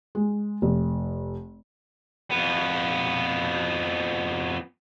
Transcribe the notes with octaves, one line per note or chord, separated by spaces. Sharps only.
G#3
F1
F2 B3